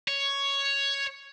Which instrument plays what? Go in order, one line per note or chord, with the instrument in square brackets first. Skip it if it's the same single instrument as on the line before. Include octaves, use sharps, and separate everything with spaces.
[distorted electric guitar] C#5